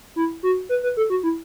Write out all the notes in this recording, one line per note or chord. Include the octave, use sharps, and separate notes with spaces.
E4
F#4
B4
B4
A4
F#4
E4